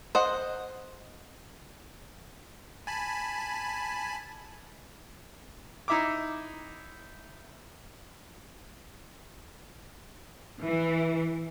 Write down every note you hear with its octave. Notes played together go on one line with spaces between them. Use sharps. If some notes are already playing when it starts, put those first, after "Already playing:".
C5 D#5 F#5
G#5 A5 B5
D#4 E4 E5 A#5 D6
E3